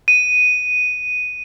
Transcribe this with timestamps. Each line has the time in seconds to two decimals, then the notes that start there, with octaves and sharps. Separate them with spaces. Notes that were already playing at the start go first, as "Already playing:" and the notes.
0.08 D#7